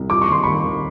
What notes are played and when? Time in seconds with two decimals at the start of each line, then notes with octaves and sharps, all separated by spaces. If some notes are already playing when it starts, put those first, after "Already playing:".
Already playing: C2
0.09 F3 D6
0.21 C#6
0.28 D#2 C6
0.43 D#2 B5 C#6
0.65 D#2